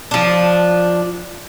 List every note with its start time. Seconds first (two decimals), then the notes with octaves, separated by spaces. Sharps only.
0.11 F3 D4